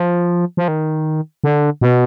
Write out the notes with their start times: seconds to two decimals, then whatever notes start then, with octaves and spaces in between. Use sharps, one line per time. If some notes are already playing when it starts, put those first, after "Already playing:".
Already playing: F3
0.57 F3
0.68 D#3
1.44 D3
1.81 B2